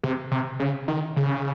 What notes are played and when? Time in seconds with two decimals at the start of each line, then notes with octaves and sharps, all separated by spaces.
0.03 C3
0.31 C3
0.60 C#3
0.88 D#3
1.16 C#3